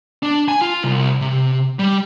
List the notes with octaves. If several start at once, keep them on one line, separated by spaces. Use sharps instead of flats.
D4
G#5
F4
C2
C3
G3